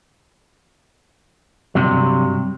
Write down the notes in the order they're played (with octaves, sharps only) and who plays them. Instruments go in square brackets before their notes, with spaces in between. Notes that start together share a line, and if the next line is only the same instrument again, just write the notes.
[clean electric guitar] G2 C3 F#3